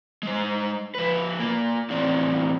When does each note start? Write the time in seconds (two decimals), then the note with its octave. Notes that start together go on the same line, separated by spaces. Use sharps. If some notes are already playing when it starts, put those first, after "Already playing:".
0.23 G#3 C5
0.95 F3 B4
1.39 A#3 F4
1.90 E2 A2 C4 D5